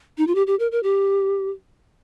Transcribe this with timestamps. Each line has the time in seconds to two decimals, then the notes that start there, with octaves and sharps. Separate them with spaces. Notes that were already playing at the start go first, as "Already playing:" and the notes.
0.18 D#4
0.27 F4
0.35 G4
0.47 G4
0.59 A#4
0.72 A#4
0.83 G4